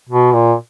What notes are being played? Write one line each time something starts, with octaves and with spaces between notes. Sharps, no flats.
B2
A#2